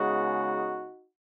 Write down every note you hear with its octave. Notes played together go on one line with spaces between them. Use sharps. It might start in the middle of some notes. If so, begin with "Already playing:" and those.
Already playing: C#3 G#3 B3 D#4 F#4